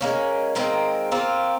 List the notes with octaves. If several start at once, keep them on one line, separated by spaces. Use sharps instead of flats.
G#3 A#3 C#4
D#3 G#3 A#3 C4
A#3 C4 F4